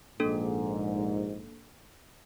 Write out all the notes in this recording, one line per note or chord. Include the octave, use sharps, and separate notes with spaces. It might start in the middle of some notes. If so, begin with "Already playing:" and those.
A#1 G#2 A#3 D4 A4